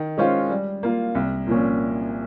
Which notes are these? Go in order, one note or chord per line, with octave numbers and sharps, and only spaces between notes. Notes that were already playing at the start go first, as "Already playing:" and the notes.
Already playing: D#3
G#3 C#4 F4 C5
G3
A#3 F4
C2
A#2 F3 A#3 C#4